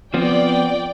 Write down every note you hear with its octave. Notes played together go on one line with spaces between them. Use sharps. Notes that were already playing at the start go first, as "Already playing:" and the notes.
F3 B3 C4 D5 G5